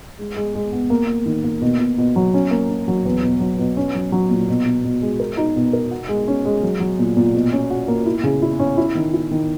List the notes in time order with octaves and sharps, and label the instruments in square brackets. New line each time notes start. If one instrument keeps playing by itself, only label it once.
[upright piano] G#3
G#3
G#3
B3
A#3
A#3
D#3
A#3
B2
B2
B2
F#3
C#4
A#3
C#4
F#3
E2
B2
F#3
B2
C#4
F#3
F#3
A#2
B2
B2
B2
G#3
A#4
D#4
B2
A#4
F#4
G#3
C#4
G#3
F#3
F#3
A#2
A#2
B2
C#4
F#4
A#3
E4
C#3
E4
C#4
E4
D#3
E4
D#3